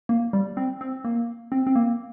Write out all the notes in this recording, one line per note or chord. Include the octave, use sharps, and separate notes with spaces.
A#3
G3
C4
C4
A#3
C4
C4
A#3